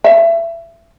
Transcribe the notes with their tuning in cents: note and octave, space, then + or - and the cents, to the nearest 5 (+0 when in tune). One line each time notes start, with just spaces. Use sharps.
E5 +25